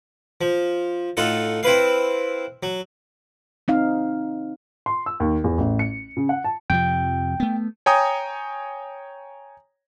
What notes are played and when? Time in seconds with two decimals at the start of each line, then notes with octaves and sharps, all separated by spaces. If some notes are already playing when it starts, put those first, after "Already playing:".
0.41 F3
1.17 A2 D#4 F4 A4 F#5
1.63 C4 E4 B4 F5
2.63 F#3
3.68 C4 D#4 F5
4.86 C6
5.06 E6
5.20 D#2
5.44 E2
5.58 A1
5.79 C#7
6.17 C#3
6.29 F#5
6.45 A5
6.70 F2 C3 F3 G5
7.40 A3 B3
7.86 C#5 G5 G#5 A#5 D#6